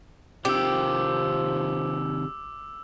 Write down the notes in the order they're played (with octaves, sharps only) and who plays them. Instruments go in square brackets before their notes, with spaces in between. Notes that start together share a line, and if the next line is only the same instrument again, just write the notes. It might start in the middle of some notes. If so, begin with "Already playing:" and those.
[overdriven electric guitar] C3 D#3 [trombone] F3 [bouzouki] G4 [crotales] D6 E6